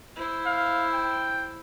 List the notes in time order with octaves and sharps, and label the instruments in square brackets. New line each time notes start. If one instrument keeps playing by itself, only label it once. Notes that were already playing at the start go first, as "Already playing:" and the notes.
[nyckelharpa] E4 C5
[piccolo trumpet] F5
G5